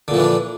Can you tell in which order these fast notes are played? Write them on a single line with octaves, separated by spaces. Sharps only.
D3 A#2 F3 E3 D4